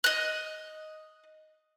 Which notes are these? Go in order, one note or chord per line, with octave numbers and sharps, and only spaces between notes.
D#5 F#6